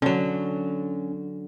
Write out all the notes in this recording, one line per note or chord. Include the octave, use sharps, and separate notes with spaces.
D3 F#3 C#4